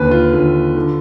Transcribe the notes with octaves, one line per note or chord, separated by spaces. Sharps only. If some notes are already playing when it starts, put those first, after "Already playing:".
Already playing: D#2 D3 B4
F4
D#2 D3
D3